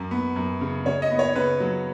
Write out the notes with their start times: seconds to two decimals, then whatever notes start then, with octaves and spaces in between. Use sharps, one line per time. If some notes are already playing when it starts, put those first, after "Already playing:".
Already playing: F#2
0.11 B3
0.36 F#2
0.61 C#3
0.86 C#3 C#5
1.02 D#5
1.11 B3
1.19 C#5
1.35 C#3 B4
1.60 F#3